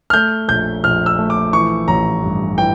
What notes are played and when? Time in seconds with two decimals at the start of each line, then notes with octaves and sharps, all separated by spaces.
0.10 F6
0.13 A3 G6
0.48 A#1 G6
0.84 A#1 F6
1.06 E6
1.19 A3
1.30 D6
1.53 E3 C#6
1.88 A1 A#5
2.23 G2
2.58 E3 G5